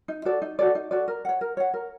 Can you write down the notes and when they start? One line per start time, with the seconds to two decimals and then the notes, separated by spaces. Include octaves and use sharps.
0.08 D#4
0.25 F#4 A4 D5
0.42 D#4
0.59 F#4 A4 D5
0.75 D#4
0.91 F#4 A4 D5
1.08 A#4
1.25 C#5 F#5
1.41 A#4
1.57 C#5 F#5
1.74 A#4